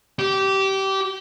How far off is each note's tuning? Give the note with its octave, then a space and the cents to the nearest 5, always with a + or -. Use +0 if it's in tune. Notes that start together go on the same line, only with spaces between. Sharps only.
G4 -20